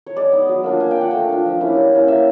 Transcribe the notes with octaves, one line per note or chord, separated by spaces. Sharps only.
C#5
G#3 D5
B3 D#4
F#3
A#3 D4 F4
A#3 G#5
G5
D4 F4 F#5
A3 G5
D4 F4
F3
A#3 C#4 E4
G3
A#3 C#4 E4
A#3 E5